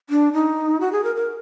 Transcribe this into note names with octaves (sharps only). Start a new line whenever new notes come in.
D4
D#4
F#4
G#4
A#4
A#4